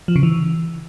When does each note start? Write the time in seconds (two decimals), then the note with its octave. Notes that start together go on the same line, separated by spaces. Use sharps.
0.08 F3
0.16 C#3
0.23 E3